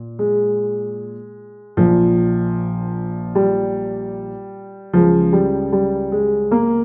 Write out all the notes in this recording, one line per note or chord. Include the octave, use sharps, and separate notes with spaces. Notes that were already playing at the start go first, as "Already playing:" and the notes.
Already playing: A#2
G#3
A#1 A#2 F3
G3
C#2 C#3 F3
G3
G3
G#3
A#3